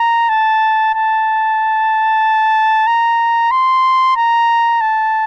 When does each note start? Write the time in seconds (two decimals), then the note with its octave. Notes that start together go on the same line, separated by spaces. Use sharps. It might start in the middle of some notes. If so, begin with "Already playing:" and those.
Already playing: A#5
0.29 A5
0.94 A5
2.87 A#5
3.51 C6
4.16 A#5
4.81 A5